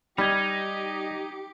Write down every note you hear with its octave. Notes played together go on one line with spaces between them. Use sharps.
G3 D#4 G4 G#6 B6